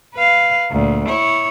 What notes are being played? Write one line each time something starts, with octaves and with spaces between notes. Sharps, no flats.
B4 F5
D2 A#2
E4 C#5